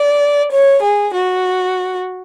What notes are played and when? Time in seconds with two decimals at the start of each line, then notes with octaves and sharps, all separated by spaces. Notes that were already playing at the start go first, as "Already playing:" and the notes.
Already playing: D5
0.51 C#5
0.82 G#4
1.13 F#4